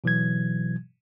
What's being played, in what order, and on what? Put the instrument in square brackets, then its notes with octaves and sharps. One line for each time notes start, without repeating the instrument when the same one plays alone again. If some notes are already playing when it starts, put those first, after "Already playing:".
[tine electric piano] B2 E3 F#3 G#6